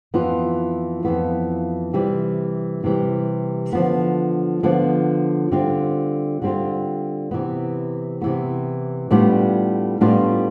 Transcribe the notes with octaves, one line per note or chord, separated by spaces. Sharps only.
F2 E3 B3 F4
F2 E3 B3 F4
C3 E3 G3
C3 E3 G3
D3 F3 B3
D3 F3 B3
D3 G3 C4 F4
D3 G3 C4 F4
C3 E3 B3
C3 E3 B3
A2 G3 B3 D4 F4
A2 G3 B3 D4 F4